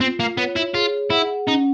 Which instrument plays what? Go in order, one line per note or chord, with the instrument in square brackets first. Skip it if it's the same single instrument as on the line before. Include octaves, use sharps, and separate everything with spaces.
[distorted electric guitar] C4 [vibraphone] F4
[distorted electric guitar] A#3
[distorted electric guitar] B3 [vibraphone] C#5
[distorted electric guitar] E4
[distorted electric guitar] F4 [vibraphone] G#4
[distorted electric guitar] E4 [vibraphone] F#5
[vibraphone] C#4 [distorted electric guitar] D#4